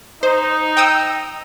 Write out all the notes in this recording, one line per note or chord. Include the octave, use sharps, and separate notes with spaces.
D#4 C5
G5 D#6 E6